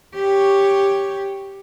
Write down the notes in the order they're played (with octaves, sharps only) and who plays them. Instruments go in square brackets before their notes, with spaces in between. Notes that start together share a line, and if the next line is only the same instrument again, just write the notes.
[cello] G4 C#5